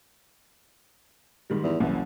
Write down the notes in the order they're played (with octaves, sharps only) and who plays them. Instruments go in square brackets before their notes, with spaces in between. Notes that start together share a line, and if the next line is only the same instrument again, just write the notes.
[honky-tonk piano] G#2 D#3 G3
[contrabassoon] E2
[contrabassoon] F#1 [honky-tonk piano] C2 E3